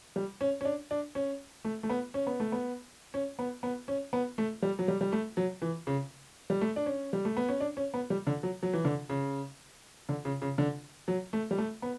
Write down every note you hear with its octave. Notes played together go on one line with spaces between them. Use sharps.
G3
C#4
C#4
D4
D4
C#4
A3
A3
B3
C#4
B3
A3
B3
C#4
B3
B3
C#4
B3
A3
G3
F#3
G3
G3
A3
F#3
E3
C#3
G3
A3
D4
C#4
G3
A3
B3
C#4
D4
C#4
B3
G3
D3
F#3
F#3
E3
D3
C#3
D3
C#3
C#3
D3
F#3
A3
G3
A3
B3